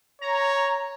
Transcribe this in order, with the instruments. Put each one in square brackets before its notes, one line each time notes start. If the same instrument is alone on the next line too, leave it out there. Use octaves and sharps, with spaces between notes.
[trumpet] C#5 [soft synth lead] A#5